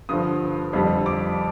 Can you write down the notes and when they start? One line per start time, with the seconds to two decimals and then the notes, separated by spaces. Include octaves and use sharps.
0.09 G2 D3 F3 D#6
0.73 F2 D3 G3
1.06 D6